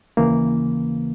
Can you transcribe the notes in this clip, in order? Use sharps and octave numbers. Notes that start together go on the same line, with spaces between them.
D#2 C#3 E3 A#3